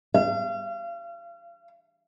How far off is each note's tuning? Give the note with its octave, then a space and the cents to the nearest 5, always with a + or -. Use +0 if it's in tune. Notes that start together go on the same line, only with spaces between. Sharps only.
F5 -35